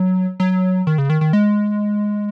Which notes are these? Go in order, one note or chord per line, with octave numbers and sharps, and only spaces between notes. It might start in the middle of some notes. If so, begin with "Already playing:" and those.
Already playing: F#3
F#3
D#3
C#3
D#3
D#3
G#3